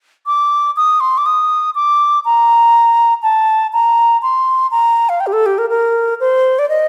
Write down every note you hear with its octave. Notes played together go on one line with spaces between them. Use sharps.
D6
D#6
C6
D6
D#6
D6
A#5
A5
A#5
C6
A#5
F5
G5
G4
A4
G4
A#4
A#4
C5
D5
D#5